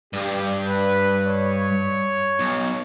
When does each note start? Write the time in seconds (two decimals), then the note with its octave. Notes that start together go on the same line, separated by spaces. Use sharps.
0.13 G2 G4
0.65 B4
1.24 C#5
2.39 B1